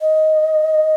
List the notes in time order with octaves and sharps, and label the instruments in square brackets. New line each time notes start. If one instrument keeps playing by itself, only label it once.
[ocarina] D#5